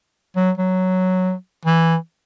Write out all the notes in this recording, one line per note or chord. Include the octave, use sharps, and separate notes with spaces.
F#3
F#3
E3